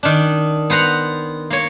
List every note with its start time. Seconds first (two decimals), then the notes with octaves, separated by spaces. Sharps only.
0.03 D#3 D4
0.70 B3 C5 F#5 A#5
1.50 A#3 C#5